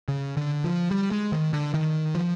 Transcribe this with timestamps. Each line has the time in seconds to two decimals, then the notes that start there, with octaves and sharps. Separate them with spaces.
0.08 C#3
0.37 D3
0.64 F3
0.91 G3
1.11 G#3
1.32 D#3
1.53 D3
1.74 D#3
2.15 F3